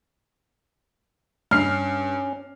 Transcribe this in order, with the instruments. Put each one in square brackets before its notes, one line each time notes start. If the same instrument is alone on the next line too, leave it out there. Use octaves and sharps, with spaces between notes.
[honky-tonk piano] G2 C7 [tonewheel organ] C#4 [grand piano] F6